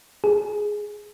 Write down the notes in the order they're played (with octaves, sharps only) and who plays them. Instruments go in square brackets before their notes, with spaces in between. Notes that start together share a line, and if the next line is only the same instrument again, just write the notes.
[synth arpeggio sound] G#4